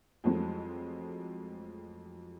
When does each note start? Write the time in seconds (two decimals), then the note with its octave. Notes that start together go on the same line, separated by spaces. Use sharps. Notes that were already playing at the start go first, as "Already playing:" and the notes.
0.24 F2 E3 F#3 G#3 A3 C4